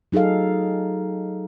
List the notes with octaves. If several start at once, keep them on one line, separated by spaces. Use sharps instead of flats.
F#3 D#4 G#4 A4 F5